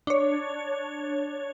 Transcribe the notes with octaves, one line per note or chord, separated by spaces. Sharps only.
D4 C#5